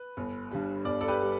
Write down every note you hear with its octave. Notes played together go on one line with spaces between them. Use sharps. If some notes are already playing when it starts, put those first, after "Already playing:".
Already playing: B4
G1
G2 G3
G1 D5
A4 D5
G4 B4
G3